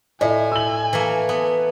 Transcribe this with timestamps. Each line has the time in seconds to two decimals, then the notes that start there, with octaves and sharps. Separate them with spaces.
0.21 A2 E4 D5 D#5 G#5
0.52 E6 F#7
0.93 E3 A3 A#3
1.29 B3